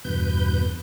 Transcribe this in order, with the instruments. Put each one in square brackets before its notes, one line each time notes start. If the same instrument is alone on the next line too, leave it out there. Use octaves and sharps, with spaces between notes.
[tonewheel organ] E2 G2 B2 B4 G6